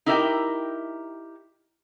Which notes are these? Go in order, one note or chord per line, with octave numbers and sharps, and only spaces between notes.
D#4 E4 G4 A#4 E5 G5